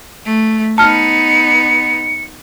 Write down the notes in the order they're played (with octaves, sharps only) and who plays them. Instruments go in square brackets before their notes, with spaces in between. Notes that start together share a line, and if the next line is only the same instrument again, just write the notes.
[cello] A3
[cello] B3 D#4 [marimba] A5 F6 [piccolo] C#7